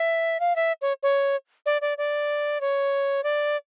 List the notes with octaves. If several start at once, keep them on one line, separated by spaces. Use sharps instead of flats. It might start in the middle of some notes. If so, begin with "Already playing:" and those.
Already playing: E5
F5
E5
C#5
C#5
D5
D5
D5
C#5
D5